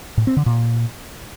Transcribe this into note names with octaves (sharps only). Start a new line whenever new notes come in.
A2
C4
D3
A#2